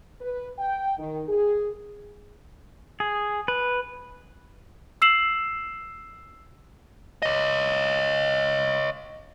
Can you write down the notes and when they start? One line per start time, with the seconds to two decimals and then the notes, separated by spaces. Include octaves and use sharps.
0.21 B4
0.59 G5
0.98 D#3
1.28 G#4
3.00 G#4
3.48 B4
5.02 E6 C7 E7 F#7
7.22 C#5 D#5